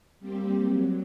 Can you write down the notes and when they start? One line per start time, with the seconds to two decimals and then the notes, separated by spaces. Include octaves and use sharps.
0.20 G3 A#3 C4 G4
0.61 F#3